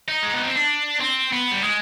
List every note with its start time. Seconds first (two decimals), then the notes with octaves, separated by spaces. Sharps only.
0.08 D#4
0.23 G#3
0.34 B3
0.44 C4
0.55 D4
1.00 C4
1.32 B3
1.51 G3
1.63 G#3